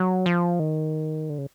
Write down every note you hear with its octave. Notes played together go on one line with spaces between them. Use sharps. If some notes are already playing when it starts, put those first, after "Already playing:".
Already playing: F#3
F3
D#3
D3
C#3